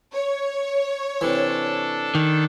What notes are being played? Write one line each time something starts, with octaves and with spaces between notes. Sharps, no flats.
C#5
C3 E3 D4 A4
D#3